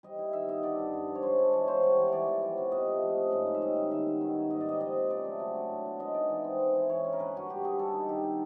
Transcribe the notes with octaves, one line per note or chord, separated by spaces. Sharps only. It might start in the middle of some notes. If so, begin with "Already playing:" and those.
G3 D#5
E4
D#3 E5
B3 D#5
D3 D5
G2
G2
F3
C#5
G#3 C5
D4
E3 C#5
B3 C5
G3 C#5
E3
E3 C#5 D5
B3
F3
C3
C3 D#5
A3
F3
C#4
G#2 D#5
A#3
E5
G3 D#5
D#3
D#3 E5
B3
D#3
A#3
G#2 D#5
D5
G3 D#5
F3 D#5
C4
C#3 D5
A3
F#3
D4
A2
B3
G#3 D#5
D#4 D5
E3
C4
G#3
E3
E3 C#5
C#4
A#4
D3 B4
G2 F#4
G2 G4
G3 G#4
G3 A4
D#4
D#3 G4
B3